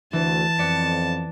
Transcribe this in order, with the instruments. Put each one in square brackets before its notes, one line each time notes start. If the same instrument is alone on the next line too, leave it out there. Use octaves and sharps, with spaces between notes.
[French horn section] D2 [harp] E3 [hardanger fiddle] A5
[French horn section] F2 [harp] B3 D5 C#7